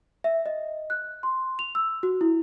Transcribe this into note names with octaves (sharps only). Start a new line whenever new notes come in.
E5
D#5
F#6
C6
F7
E6
F#4
E4